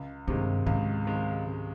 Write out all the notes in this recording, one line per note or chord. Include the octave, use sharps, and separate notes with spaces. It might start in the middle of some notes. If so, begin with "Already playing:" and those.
Already playing: C#2
G2 C3 D#3 G#3
C#2 G#2
C3 D#3 G#3
C#2